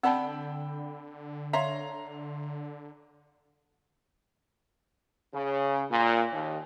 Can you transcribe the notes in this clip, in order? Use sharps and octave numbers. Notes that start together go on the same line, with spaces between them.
D3 C4 D5 F#5 G5 A5 B5 E6
C#5 E5 F5 A#5 C6
C#3
A#2
D#2